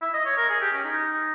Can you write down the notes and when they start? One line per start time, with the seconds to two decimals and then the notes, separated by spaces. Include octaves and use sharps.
0.02 E5
0.14 D#5
0.25 C#5
0.37 A#4
0.49 G#4
0.61 G4
0.73 C#4
0.84 D#4